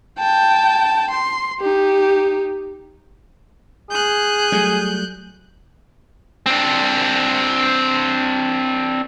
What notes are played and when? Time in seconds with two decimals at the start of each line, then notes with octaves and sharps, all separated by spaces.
0.19 G5 A5
1.11 C6
1.61 D#4 G4
3.91 G#4 F#6 G6
4.52 F#3 G3 A3
6.46 C4 D4